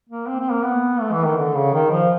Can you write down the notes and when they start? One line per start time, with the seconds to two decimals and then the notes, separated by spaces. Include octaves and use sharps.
0.09 A#3
0.28 C4
0.39 C4
0.51 A#3
0.64 B3
1.01 A3
1.12 E3
1.24 D#3
1.36 D3
1.55 C#3
1.73 D#3
1.91 F3